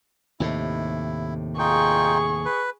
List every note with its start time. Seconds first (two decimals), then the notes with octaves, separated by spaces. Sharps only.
0.40 D#2 A2 C3 E4
1.59 D#4 F4 G#4 G5 C#6
2.45 B4